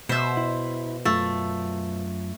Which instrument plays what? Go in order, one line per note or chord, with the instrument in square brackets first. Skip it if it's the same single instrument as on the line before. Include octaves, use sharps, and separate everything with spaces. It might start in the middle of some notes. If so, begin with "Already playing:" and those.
[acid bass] B2 [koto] C5 E5
[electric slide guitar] E4
[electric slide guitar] F#2 F4 [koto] A3